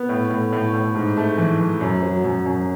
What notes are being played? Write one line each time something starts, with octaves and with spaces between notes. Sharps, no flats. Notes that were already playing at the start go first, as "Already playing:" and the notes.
Already playing: B3
A2
A2
A2
A2
G#2
A3
E3
E3
F#2
F#3
F#2
F#2